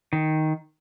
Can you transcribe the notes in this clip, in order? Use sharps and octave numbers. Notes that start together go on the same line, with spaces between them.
D#3